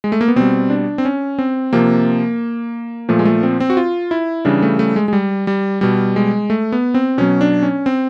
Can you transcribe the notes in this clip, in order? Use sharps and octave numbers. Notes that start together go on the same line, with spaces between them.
G#3
A3
A#3
B3
B2 G3 C4
D4
C4
C#4
C4
C3 F3 A#3
A#2 F3 A3
G#3
A3
C4
C4
F#4
F4
E4
C#3 E3 G3 D4
A3
A3
G#3
G#3
G3
G3
B2 G3
G#3
A3
B3
C4
B2 F#3 C#4
D4
C#4
C4